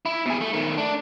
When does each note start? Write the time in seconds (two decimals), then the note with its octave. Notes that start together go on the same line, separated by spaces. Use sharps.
0.06 E4
0.26 B2 G#4
0.41 A3
0.53 D#3 A3
0.78 D4